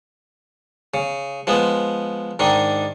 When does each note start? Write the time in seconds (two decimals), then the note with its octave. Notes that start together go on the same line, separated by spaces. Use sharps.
0.94 C#3
1.47 F3 G#3 B3
2.39 G#2 D#3 D4